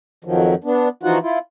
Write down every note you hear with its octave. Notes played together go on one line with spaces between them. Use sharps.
F2 D#3 F3 F#3
B3 D4
E3 F3 D#4 F4 F#4 F#5
E4 F4